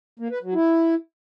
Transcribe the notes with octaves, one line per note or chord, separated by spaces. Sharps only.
A#3
B4
F#3
E4